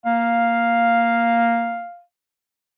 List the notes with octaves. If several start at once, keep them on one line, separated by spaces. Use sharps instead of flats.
A#3 F5